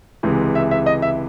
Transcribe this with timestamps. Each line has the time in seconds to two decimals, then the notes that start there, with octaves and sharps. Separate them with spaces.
0.23 C#2 C3 E3 G#3
0.55 E5
0.71 E5
0.86 D#5
1.02 E5